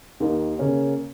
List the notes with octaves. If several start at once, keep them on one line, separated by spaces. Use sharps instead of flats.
D#2 D#3 A#3 D#4
C#3 A#3 C#4